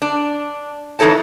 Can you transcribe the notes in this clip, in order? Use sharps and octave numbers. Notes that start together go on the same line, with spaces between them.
D4
F2 E3 D#4 A4 C#5 A5